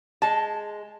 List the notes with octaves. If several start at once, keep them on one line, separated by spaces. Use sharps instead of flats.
G#3 A5